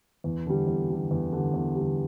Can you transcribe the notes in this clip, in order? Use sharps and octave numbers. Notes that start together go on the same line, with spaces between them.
E2
D3 G3
E2
D3 G3
E2
D3 G3
E2
D3 G3